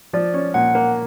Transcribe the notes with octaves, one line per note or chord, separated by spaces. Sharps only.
F3 D5
C#4
A#2 F#5
A#3